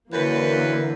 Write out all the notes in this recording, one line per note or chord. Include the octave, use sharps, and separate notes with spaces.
F#2 D3 E3 A#3 B4